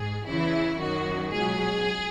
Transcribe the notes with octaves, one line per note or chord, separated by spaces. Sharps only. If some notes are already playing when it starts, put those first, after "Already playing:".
Already playing: G#2 G#4
E2 C#3 E3 E4
F#2 D#3 F#3 F#4
C#2 B2 F#3 G#4